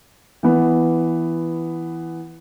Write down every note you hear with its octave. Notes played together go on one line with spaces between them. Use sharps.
E3 B3